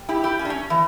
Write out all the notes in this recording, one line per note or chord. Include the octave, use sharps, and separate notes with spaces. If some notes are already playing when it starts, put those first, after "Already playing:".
Already playing: G3
E4 G4
E4 G4
C#4
D4
C#4
E3